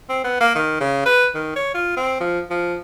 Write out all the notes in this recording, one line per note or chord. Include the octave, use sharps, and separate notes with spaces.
C4
B3
A#3
D#3
C#3
B4
D#3
C#5
F4
C4
F3
F3